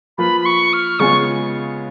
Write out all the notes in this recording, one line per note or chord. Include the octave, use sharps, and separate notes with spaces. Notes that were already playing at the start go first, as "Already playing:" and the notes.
F3 A#3 F4 B4 B5
B5
C#6
F6
C#3 G#3 B3 F4 G#4 C#6